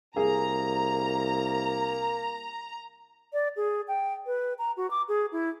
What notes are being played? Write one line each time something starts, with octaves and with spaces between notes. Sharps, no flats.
C2 A#3 G#4 A#5
D5
G#4
G5
B4
A#5
F#4
D6
G#4
E4